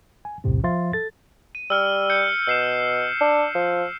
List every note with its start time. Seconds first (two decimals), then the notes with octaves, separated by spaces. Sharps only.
0.25 G#5
0.44 B1 E2 A2 C3 C4
0.64 F3 E5 F5 C6 A6
0.93 A4 A6
1.55 D#7
1.70 G3 E6 F6
2.10 G6 C#7
2.47 B2 E6 C7 E7
3.20 D4
3.55 F3